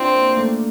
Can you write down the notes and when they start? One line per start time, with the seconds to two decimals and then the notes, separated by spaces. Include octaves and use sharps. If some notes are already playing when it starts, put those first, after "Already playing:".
Already playing: C4 D4 E4 F4
0.14 A#3
0.29 A#3
0.37 A3